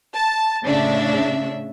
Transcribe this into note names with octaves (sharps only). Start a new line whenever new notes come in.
A5
A2 C#3 D4 E5